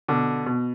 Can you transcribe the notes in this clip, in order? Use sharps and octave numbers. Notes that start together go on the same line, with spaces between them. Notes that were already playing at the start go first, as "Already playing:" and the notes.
B2 D3
B2